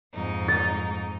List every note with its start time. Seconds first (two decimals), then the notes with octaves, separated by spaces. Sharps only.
0.14 F2 G#2 D#4
0.48 A6